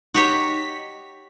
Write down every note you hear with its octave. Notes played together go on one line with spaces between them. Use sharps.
D#4 F#4 G4 C#5 B6